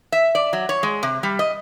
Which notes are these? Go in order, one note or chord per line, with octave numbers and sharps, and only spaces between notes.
E5
D5
F#3
C#5
G#3
C3
G3
D#5